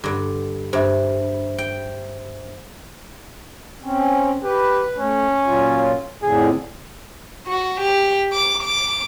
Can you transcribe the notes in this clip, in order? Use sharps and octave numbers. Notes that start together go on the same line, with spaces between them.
G2 D3
G2 C5 E5
G5
C4 C#4
G4 B4
A3 C#4
A#2 F#3 F4
F2 A2 D3 G#4
F#4
G4
D6
D6